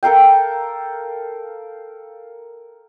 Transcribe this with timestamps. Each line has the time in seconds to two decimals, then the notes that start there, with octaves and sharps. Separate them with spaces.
0.03 A4 A#4 F5 G5